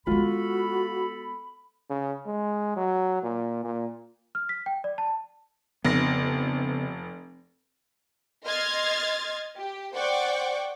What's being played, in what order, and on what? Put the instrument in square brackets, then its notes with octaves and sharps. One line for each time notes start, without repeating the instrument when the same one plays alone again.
[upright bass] G#3 B3 [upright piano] F4 [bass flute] F#4 [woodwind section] A4 B5
[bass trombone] C#3
G#3
F#3
A#2
A#2
[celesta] F6
B6
G5
D5
A5
[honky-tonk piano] F1 A#6 [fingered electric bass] C#3 B3
[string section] D#5 C6 F6 G#6 A6
G4
C5 D5 F#5 G5 C#6 D6